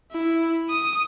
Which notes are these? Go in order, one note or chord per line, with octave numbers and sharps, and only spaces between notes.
E4
D#6